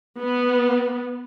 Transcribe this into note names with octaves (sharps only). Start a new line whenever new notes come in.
B3